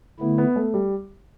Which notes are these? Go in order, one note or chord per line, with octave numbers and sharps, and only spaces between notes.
D3 A3 B3 E4
B3
A3
G3